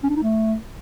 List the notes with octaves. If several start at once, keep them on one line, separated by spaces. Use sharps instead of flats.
C#4
D4
D#4
A3